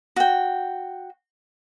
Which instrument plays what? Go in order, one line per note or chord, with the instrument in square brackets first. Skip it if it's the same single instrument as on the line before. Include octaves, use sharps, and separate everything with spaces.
[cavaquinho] F#4 G5